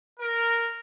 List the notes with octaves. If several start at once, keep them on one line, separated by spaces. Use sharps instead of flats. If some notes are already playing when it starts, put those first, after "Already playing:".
A#4